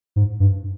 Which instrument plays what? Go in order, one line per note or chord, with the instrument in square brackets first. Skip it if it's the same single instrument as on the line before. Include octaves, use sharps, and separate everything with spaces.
[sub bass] G#2
G2